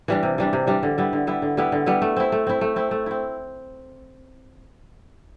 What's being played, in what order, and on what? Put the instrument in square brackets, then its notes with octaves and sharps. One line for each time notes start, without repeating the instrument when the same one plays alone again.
[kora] E3 G3 D4
C3
E3 G3 D4
C3
E3 G3 D4
D3
G3 B3 E4
D3
G3 B3 E4
D3
G3 B3 E4
D3
G3 B3 E4
A3
C4 E4
A3
C4 E4
A3
C4 E4
A3
C4 E4